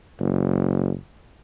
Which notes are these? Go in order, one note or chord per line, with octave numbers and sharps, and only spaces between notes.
F#1